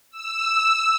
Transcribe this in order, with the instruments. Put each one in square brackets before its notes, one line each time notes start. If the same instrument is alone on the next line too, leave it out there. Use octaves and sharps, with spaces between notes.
[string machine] E6